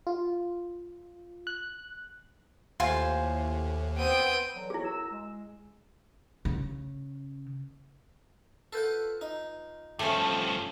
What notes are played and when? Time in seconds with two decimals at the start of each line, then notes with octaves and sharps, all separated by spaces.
0.07 F4
1.47 F#6
2.80 D#2 A2 F4 C5 G#5
3.98 B3 C4 G5 D#7
4.55 D3 E3 F#3
4.70 F2 E3 E4 G#4 C#5
4.84 F#2 A#5 E6
5.11 G#3
6.45 C#3
8.73 F4 A4 B4 F#5 G6
9.21 D#4
9.99 G2 F3 A3 C#4 A4 A5